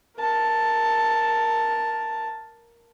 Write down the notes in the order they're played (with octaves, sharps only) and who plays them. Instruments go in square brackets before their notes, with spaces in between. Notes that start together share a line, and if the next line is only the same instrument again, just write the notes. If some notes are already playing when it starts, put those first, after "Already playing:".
[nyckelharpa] A#4 A5